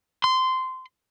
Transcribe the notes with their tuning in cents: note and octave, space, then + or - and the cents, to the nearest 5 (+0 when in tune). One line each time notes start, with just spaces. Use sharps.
C6 -15